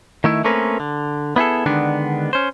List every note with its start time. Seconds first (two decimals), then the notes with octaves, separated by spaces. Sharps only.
0.24 D#3 A3 E4
0.44 A3 A#3 C4 C#4 A#4 B4
0.80 D3
1.36 B3 E4 G#4 A4
1.66 D3 D#3 G#3 B3 D4
2.33 C#4 C5